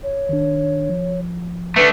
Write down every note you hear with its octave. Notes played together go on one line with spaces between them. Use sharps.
C#5
D#3 D4
F3
A3 D4 B4